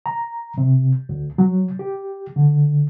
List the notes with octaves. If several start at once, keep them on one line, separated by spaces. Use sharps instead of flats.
A#5
C3
D2
F#3
G4
D3